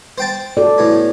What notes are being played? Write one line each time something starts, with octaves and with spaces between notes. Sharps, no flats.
C5 G5 A5
F#4 A4 D5
E2 A2